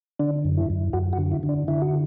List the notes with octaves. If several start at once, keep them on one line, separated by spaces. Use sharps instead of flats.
D3 D4
F#2
E4
F#2
F#2 F#4
F#4
D3
E4
D3
D4
D3 E4
F#4